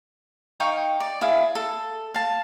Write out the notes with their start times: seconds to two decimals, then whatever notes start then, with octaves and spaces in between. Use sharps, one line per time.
0.60 D#4 F5 G5 C#6
1.00 D5
1.21 E4 G#4 F5
1.55 A4
2.14 F5 A5